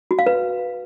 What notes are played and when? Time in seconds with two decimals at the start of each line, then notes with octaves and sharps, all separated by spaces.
0.11 F#4
0.19 F5
0.26 B4